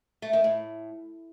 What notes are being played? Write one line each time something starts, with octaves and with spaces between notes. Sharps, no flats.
A3
D#3
A2